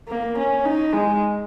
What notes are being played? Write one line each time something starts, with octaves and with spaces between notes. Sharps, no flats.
A#3
C#4
D#4
G#3